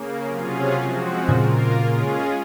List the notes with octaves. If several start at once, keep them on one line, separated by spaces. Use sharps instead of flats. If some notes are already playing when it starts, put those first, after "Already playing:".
Already playing: C#3 A#3
C3 F#3 C#4 F4 G#4
F3 G#3 C4 F#4
A#2 C#3 A#3 F4 A#4
G#3 C#4 F4 G#4